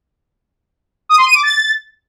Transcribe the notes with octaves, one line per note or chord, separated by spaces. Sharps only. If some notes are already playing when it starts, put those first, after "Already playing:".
D#6
C6
D#7
D6
A6